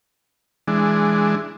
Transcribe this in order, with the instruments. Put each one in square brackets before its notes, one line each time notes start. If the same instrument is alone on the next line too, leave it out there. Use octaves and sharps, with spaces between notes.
[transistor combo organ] E3 G#3 D4